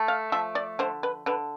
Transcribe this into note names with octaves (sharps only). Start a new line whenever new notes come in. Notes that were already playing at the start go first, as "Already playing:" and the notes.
Already playing: A3
F5
F3 E5
D5
D3 C5
B4
D3 B4